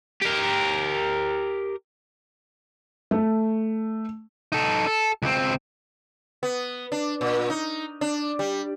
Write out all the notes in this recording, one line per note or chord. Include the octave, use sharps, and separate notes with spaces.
G4 A#4
A3
D#4 A4
A4
C#2 C4
B3
D4
A#2
D#4
D4
G3